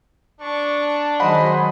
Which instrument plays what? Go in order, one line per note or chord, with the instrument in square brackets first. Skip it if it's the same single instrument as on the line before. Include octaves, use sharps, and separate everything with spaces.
[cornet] D4 [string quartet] C#6 D6
[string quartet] D#3 F#3 G#3 [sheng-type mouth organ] C5 D#5 [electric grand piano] F#5 B5